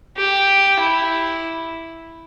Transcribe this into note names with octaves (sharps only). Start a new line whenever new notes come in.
G4
E4